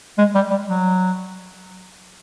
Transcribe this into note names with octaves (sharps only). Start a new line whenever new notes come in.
G#3
G3
G3
F#3